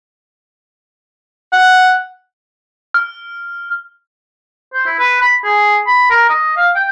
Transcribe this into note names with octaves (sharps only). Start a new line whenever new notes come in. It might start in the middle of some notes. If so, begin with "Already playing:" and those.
F#5
F6
C5
E4
B4
B5
G#4
B5
A#4
D#5
F5
G5